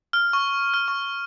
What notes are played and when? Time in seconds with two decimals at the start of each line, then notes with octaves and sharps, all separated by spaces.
0.13 F6
0.33 C#6
0.74 F6
0.88 C#6